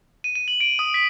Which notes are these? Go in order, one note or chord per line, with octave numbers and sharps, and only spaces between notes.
D#7
D#7
F#7
D7
D#6
B6